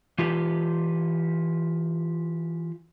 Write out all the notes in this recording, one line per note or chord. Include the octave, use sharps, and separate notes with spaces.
E3 F4 G4 B4